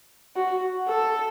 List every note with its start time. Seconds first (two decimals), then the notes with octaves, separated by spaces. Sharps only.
0.36 F#4
0.88 A4